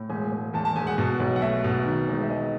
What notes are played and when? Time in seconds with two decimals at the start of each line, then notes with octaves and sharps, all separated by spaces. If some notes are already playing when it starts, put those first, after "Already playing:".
Already playing: A2
0.09 E1 G#5
0.32 E1
0.54 E2 A5
0.65 A5
0.76 E1 G#5
0.87 F#5
0.98 B2
1.20 B1
1.36 F#5
1.42 A3 E5
1.64 B2
1.86 D#3
2.09 E1
2.23 E5
2.30 E1 D#5